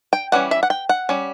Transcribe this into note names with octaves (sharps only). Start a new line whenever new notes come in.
G5
E3 G3 C#4 F#5
E5
F#5
G5
F#5
G3 C#4